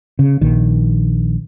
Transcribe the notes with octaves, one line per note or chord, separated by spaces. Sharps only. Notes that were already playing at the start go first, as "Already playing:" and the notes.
C#3
A#1 D#3